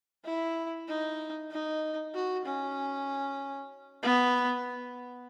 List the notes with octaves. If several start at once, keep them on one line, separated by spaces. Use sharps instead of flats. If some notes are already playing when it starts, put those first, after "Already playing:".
E4
D#4
D#4
F#4
C#4
B3